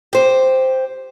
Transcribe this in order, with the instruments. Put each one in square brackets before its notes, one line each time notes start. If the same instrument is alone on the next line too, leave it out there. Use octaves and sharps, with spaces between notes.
[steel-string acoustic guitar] G4 C5